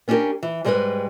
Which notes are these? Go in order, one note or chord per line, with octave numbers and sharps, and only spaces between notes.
B3 C#4 D4 E4 G4 A#4
E3
G#2 G3 G#3 C#4 G#4 B4